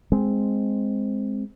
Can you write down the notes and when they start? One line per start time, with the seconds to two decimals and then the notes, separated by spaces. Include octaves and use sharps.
0.12 G#3 C4